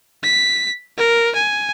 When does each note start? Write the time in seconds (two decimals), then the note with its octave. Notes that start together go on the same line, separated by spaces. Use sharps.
0.23 B6
0.98 A#4
1.35 G#5